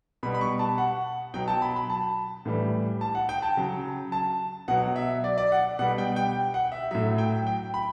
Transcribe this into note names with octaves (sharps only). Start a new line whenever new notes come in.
B2 G3 B5
B5
C#6
A5
F#5
B2 F#3 G5
A5
B5
B5
A5
A2 E3 G3
A5
F#5
G5
A5
C#3 F#3
A5
B2 F#3 F#5
E5
D5
D5
F#5
B2 G3 F#5
G5
G5
F#5
E5
A2 F#3 E5
G5
G5
B5